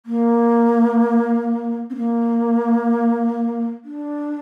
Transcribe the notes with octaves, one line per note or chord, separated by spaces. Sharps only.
A#3
C4
A#3
D4